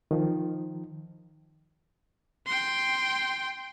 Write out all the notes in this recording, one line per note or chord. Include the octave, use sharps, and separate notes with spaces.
D#3 F3
G5 C6